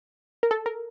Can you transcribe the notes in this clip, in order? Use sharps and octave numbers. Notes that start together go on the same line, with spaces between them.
A#4
A4
A#4